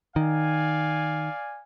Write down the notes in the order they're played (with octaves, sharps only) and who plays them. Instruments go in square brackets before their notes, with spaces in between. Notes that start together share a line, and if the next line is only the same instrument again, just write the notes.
[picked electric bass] D#3 [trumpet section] D5 F5 G#5